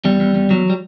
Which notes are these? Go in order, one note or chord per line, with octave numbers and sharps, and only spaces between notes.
E2 G3
E2
E2
E2 F#3
G3